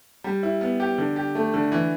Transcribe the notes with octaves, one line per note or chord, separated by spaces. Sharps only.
G3
E4
B3
G4
D3
G4
A3
D3
E3